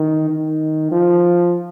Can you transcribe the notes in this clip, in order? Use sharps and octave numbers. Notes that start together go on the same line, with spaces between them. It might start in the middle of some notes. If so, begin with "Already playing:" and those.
Already playing: D#3
D#3
F3